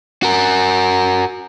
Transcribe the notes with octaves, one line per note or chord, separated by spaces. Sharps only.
F#4 A#4